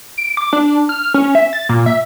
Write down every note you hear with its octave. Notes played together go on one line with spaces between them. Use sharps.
D7
D6
D4
F6
C#4
E5
A6
A#2
E5